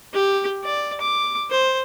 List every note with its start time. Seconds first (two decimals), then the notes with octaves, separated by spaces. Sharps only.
0.14 G4
0.64 D5
1.01 D6
1.51 C5